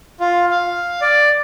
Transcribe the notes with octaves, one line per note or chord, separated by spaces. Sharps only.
F4
F5
D5